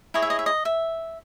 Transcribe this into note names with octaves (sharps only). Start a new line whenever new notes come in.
E4 G#4 C#5 D#5
E5
D#5
E5
D#5
E5